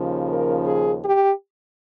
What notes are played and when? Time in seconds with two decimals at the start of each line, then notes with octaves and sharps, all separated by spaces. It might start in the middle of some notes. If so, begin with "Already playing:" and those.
Already playing: D#2 C#3 F3
0.28 A#4
0.66 G#4
1.05 G4